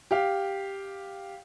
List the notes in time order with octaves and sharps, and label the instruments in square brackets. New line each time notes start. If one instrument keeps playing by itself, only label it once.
[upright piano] G4 F5